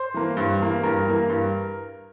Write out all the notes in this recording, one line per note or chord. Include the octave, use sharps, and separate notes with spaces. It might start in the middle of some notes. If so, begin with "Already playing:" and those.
Already playing: C5
E3 A#3
G2
E3 A#3
G2 A#4
E3 A#3
G2